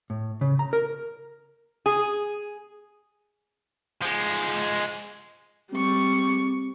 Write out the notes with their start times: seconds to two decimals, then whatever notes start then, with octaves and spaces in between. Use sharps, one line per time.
0.10 A2
0.41 C#3
0.59 A#5
0.73 A#4
1.86 G#4
4.02 F3 G#3
5.73 G3 C4 C#6